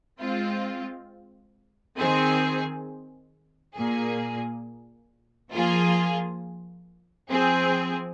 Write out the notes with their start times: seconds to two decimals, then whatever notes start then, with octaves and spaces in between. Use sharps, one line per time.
0.20 G#3 C4 F4
1.98 D#3 C4 G#4
3.76 A#2 A#3 G#4
5.52 F3 A#3 F4 G#4
7.30 F3 C4 G#4